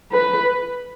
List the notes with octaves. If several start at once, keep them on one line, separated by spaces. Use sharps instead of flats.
B4